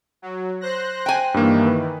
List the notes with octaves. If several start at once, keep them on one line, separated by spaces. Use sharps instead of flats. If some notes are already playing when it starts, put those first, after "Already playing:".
F#3
C5 F#6 A#6
G5 G#5
G2 D#3 E3 A#3
B4